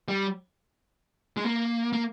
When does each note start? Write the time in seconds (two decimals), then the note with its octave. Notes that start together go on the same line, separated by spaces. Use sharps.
0.08 G3
1.37 G#3
1.45 A#3
1.93 A#3